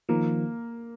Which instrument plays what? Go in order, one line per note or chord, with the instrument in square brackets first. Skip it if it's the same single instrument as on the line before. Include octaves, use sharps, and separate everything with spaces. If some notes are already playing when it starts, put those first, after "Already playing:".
[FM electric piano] D#3 F3 [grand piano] A#3